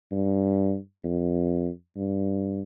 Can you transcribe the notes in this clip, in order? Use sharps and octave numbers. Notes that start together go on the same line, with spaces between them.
G2
F2
G2